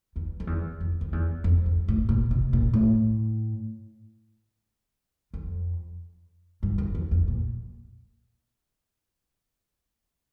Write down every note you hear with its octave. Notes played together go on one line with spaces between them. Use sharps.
E2
F2
E2
F2
F2
E2
F2
F2
A2
A#2
C3
A#2
A2
F2
G2
F2
E2
F2
A#2